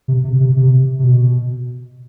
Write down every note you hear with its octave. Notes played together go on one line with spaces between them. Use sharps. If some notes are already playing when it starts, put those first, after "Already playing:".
C3
C3
C3
C3
C3
B2